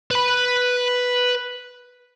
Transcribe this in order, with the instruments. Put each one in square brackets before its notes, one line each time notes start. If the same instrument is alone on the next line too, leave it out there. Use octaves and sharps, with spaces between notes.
[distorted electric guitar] B4 B5